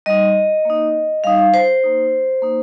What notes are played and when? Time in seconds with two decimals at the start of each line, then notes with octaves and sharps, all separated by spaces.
0.06 G3 D#4 D#5
0.65 A#3 D#4
1.24 G3 D#4 F5
1.39 F5
1.54 C5
1.84 A#3 D#4
2.42 A#3 D#4